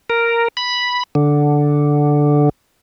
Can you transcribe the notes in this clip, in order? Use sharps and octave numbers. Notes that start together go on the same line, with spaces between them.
A#4
B5
D3